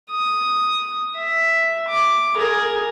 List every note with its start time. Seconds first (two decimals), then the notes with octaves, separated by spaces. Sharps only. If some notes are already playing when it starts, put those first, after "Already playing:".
0.10 D#6
1.16 E5
1.88 D6
2.36 G#4 A#4